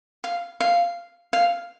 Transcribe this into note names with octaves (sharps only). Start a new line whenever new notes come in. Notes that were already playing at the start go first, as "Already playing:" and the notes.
F5
F5
F5